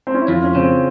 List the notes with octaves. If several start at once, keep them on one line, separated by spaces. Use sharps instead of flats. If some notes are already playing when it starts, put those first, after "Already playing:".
C4
C#4
E4
F2 F4
C#4
C#3 C4